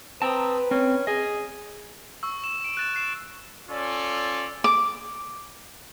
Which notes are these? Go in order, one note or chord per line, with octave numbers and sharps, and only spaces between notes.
C4 B4 A5 A#5 D#6
C4 C#4
G#4 D#5
C#6 E6
E7
D7 E7
F#6 A6 E7
F#6 C7 E7
C#4 F4 A4 D5
D6